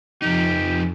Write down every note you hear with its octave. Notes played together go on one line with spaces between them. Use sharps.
F2 F3 D#4 G4